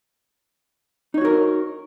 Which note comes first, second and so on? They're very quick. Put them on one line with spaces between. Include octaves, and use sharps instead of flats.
D#4 C#5 F#4 A#4